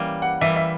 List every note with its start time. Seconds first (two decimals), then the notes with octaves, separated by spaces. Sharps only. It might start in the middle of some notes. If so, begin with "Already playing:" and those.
Already playing: E3 G3 A#3 C#4
0.22 F#5
0.41 E3 G3 A#3 E5
0.56 E5